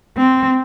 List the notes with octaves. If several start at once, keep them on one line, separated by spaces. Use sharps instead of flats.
C4